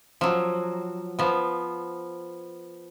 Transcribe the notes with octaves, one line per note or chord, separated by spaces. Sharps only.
F3 F#3
F3 B3